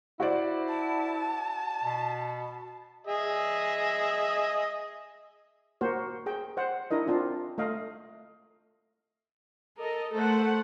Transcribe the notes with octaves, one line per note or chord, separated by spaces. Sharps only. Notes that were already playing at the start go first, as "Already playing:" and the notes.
E4 F#4 C5 D5
A5
B2
G#4 D#5 E5
A#3 F#4 C5
G#4 G5
C5 F#5
D4 E4 A#4 D#5
C4 D4 F4
A3 D#5 F5
A4 A#4 D#5
A3 A4 C5 F#5